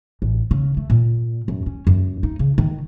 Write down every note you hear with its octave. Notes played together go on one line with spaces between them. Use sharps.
A1
C#3
A3
A#2
F#2
C#4
F#2
D#4
C#3
D#3